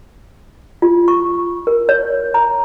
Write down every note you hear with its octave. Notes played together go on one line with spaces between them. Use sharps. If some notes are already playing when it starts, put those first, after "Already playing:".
F4
C#6
A#4
C#5
A#5